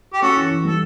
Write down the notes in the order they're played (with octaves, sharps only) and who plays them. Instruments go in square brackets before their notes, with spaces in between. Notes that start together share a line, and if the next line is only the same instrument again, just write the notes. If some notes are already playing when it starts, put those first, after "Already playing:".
[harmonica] G4
[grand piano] C#4 [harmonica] F#4 A4
[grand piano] E3
E3
[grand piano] G3 [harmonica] A4